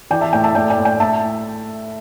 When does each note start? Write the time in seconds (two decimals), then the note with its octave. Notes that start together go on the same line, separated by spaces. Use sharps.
0.11 E3 D5 G5
0.21 E5 A5
0.33 A2 D5 G5
0.44 E5 A5
0.55 A2 D5 G5
0.70 D5 G5
0.78 A2
0.85 D5 G5
1.00 A2 E5 A5